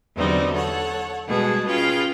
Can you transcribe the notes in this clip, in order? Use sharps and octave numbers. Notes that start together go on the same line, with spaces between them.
E2 D3 F#3 G3 C4 D#4
A4 C#5 F#5
B2 G3 G#3 G#4 B4 A5
C#4 F4 G#4 B4 F5 G5